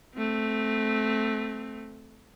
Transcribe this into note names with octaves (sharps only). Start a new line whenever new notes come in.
A3 C4